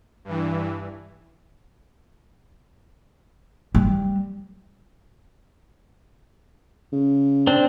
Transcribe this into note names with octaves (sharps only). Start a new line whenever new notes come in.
G2 E3
G3
C#3
C4 D4